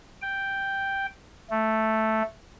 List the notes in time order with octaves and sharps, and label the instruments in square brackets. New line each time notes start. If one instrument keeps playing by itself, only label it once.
[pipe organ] G5
A3